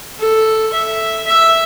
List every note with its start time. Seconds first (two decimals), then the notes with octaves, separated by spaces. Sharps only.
0.20 A4
0.74 E5
1.27 E5